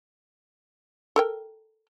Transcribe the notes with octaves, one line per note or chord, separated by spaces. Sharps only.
A4 A#4 G5